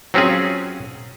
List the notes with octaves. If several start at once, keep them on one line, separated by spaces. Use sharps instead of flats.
F#3 C4 C#4 F4 G#4